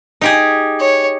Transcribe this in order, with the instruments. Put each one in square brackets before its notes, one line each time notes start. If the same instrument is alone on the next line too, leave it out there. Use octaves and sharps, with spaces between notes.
[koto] D#4 G4 G#4
[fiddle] C#5